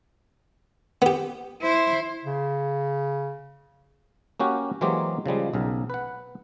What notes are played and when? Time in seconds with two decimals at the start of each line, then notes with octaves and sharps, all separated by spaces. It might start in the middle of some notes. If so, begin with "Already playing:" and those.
1.02 B3 G4
1.62 E4 C5
2.23 C#3
4.40 A#3 C#4 F#4 G4
4.81 E3 F#3 G#3 A#3 G4 C5
5.26 C#3 F3 G3 G#3
5.54 B1 C#3 A#4
5.90 B4 F#5